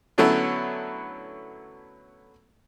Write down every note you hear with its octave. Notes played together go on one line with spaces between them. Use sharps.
D3 F#3 A3 B3 C#4 E4